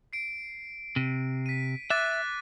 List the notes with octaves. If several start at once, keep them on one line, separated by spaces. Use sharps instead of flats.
C7 D7
C3
B6 D#7
E5 D6 F#6 A6
A6